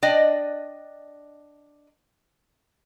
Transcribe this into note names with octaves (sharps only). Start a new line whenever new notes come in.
D4 D5 D#5 G5